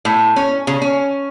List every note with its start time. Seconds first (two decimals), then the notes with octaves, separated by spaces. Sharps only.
0.05 A2
0.36 C#4
0.67 C#3
0.82 C#4